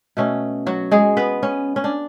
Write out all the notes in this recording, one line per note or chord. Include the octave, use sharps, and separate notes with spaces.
B2 A3 C#4
F#3 F#4
G#3 G#4
B3 B4
C#4
C#4
D4